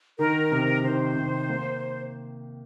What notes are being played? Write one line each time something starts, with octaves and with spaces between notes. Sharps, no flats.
D#3 A#4
C3
D#3 C5
C3
A#3